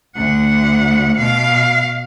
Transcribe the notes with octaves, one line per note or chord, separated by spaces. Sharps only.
D2 F#5
B2 F5